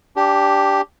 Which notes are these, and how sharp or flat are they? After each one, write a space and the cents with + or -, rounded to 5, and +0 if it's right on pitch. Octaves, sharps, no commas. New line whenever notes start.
D4 -15 G4 +0